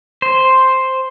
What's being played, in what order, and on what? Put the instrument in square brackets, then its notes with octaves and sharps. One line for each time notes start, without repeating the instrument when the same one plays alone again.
[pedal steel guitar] C5